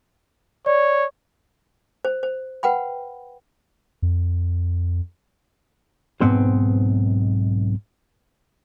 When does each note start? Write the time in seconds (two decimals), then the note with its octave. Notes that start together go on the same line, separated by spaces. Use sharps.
0.66 C#5 D5
2.05 C5
2.23 C5
2.63 B4 F#5 G5 B5
4.02 F2
6.21 B1 G#2 B3 C4 C5